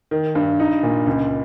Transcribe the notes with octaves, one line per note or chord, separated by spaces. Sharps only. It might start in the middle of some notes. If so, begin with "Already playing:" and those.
D#3
G2
D#4
A#2
C#2